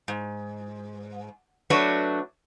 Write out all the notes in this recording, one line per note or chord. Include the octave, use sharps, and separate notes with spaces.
G#2
F#3 A3 D4 F#4 B4 C#5